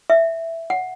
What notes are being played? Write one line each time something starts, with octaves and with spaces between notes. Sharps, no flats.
E5
F#5